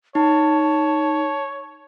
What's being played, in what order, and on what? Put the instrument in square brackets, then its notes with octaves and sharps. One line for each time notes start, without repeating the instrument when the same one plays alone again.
[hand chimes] D#4 [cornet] C#5 [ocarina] A5